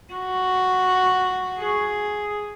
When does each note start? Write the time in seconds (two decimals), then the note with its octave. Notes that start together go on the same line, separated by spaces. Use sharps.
0.13 F#4
1.59 G#4